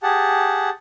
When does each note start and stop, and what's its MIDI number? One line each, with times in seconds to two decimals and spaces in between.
0.03 0.70 67
0.03 0.70 68
0.03 0.70 78
0.03 0.70 81